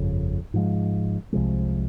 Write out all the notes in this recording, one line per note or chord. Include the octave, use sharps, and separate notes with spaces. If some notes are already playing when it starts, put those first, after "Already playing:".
Already playing: G1 F2 C#3
G#2 F3 G#3
C2 C3 F3 G#3